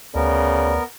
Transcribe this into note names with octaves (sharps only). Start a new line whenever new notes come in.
D2 C#3 B3 A#4 D5